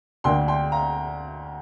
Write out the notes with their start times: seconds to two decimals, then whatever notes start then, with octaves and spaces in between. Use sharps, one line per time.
0.24 D2 D3 A#3 D4 G5 C6
0.48 G5 C6
0.72 F5 A#5